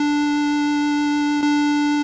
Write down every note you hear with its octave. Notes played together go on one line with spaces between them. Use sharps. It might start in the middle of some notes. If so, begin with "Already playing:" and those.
Already playing: D4
D4